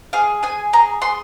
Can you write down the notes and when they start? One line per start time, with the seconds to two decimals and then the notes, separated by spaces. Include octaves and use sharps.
0.13 G#4 F5
0.43 G#4 G#5
0.73 G#4 A#5
1.02 G#4 C6